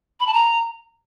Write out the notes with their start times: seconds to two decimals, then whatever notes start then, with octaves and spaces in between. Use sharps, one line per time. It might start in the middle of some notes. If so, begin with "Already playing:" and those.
0.20 B5
0.27 A5
0.34 A#5